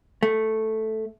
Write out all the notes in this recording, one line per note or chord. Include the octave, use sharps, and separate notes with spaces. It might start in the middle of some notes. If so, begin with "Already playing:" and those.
A3